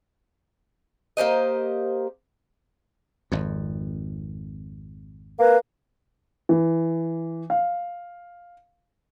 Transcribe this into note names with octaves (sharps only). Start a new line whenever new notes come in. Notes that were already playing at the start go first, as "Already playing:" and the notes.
A#3 G4 C5 D#5
G#1 F2
A#3 B4
E3
F5